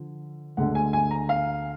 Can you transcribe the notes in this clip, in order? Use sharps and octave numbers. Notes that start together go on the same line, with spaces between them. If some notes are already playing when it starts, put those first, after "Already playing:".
Already playing: D3 F3
D2 D3 G#3 F#5
G#5
G#5
A#5
F5